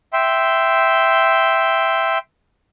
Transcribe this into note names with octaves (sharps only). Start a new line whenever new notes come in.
E5 G5 C6